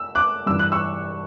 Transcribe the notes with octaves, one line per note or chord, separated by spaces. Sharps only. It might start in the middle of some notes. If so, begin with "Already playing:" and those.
Already playing: E6
D6 F#6
G2 E3 E6
F#6
C#6 E6